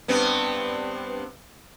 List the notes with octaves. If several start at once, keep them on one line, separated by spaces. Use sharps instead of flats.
G2 B3 C4